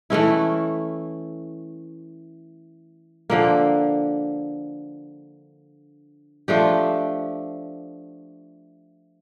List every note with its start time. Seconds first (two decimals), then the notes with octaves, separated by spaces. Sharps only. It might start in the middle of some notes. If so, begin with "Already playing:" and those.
0.10 E3 A3 C#4 E4
3.30 D3 F3 A#3
6.48 F3 A3 D4 G4